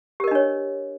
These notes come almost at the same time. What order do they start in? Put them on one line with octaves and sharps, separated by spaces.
G4 A#4 D#5 D4 C#5